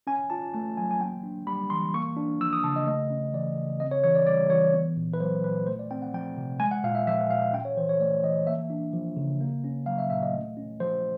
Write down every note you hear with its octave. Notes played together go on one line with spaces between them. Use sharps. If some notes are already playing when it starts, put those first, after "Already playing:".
C#4 G#5
F4 A5
A3 A5
F#3 G#5
G#5
A#3 G5
D4
G3 B5
E3 C6
A#3 C#6
D4
F3 E6
D#6
C#3 A5
D#5
A3 D#5
C#4
E3 D5
C#3
C4 D#5
C#5
E3 C#5
D5
G3 D5
E3 C#5
B3
A#2
B4
F#3 C5
A#2 B4
A3 C5
D5
C4 G5
F#5
F3 G5
C3
G#3 G#5
F#5
A#2 F5
E5
F3 E5
A#2 F5
C#4 G5
C#5
E3 C5
C#5
A3 D5
E3 D#5
A#3 E5
D4
F3
C#3
A#3
C#4
F#3 F5
E5
A#2 E5
D#5
A3
C#4
F3 C5